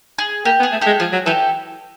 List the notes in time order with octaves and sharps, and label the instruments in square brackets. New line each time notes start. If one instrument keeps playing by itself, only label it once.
[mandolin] G#4
[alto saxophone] A#3 [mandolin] G4
[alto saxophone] B3
[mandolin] G#4
[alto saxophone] A3
[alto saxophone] G#3 [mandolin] G4 A4
[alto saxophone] F3 [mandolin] G#4
[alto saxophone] F#3
[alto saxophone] E3 [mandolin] G4 A4